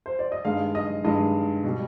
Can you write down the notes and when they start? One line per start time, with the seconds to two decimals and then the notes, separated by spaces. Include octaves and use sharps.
0.06 C5
0.19 D5
0.32 D#5
0.44 G2 D#3 G#3 F5
0.75 D#5
1.04 G2 D#3 G#3 D#5
1.64 B2 G3